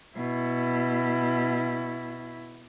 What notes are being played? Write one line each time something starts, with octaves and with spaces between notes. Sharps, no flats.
B2 E4